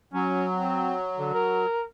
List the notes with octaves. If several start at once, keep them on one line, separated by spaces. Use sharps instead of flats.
F#3 C#4
C4
D3
A#4